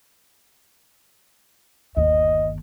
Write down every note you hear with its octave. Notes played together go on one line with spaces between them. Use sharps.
G1 D#2 D#5